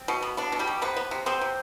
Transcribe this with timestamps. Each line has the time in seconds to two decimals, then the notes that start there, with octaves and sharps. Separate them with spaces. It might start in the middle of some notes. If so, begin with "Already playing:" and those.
Already playing: C4
0.08 B2
0.23 B3
0.37 B3 D4
0.52 B2
0.59 G3 G4
0.67 B2
0.82 C3 B3 B4
0.96 B3
1.11 C3
1.26 B3 C4 C5
1.41 C3